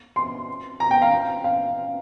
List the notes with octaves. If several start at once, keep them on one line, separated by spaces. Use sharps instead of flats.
C6
A#5
G5
F5
F5